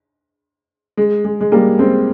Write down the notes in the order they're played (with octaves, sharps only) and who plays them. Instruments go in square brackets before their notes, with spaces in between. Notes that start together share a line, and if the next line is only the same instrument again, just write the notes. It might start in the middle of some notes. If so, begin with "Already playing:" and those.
[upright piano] G#3
G#3
G#3
G3 A#3
G#3 C4